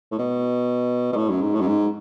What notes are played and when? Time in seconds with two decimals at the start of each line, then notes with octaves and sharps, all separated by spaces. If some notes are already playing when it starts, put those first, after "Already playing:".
0.11 A2
0.19 B2
1.13 B2
1.17 A2
1.29 F#2
1.41 G#2
1.55 A2
1.61 F#2
1.67 G#2